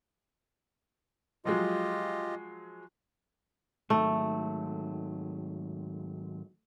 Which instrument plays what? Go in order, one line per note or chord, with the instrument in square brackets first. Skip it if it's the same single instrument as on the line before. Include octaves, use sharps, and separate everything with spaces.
[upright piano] F3 F#3 G#3 [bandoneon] F4 G4 D#5
[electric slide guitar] G#2 D#3 F#3 [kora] A3